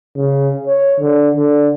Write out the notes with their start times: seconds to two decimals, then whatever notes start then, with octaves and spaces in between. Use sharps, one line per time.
0.16 C#3
0.66 C#5
1.00 D3
1.37 D3